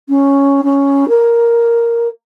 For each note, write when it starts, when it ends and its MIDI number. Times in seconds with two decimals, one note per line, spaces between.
0.09 0.61 61
0.64 1.07 61
1.08 2.07 70